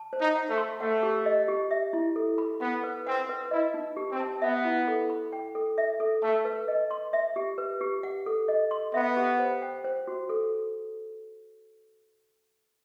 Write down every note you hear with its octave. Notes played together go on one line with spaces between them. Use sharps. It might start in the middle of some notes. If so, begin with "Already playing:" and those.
Already playing: A5
C5
D#4
F#5
A3
C6
A3 F#5
G4
D#5
G4
E5
E4
A4
B5
B3 B5
B4
C4 F#5
B4
E4 D#5
D#4
G4
C4
A5
B3 E5
E4
A4
B5
G5
A4
E5
A4
A3 A5
B4
D#5
C6
E5
G4
B4
G4
F#5
A4
D#5
C6
B3 E5
G4
C5
G5
C5
F#4
A4